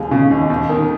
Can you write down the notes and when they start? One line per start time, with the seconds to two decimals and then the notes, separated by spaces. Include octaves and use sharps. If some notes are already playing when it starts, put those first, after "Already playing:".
Already playing: D#2 G#3 F4
0.11 C#3
0.31 D#2
0.50 D#2
0.69 D#3